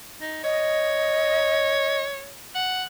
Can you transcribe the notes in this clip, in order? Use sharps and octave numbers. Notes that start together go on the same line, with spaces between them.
D#4
C#5 D#5
F#5